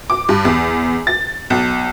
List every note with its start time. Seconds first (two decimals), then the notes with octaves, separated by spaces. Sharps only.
0.10 D6
0.29 G2
0.45 E2
1.07 A6
1.50 B1